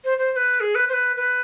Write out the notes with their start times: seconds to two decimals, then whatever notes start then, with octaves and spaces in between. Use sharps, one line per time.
0.04 C5
0.18 C5
0.32 C5
0.36 B4
0.60 G#4
0.75 B4
0.89 C5
0.93 B4
1.16 B4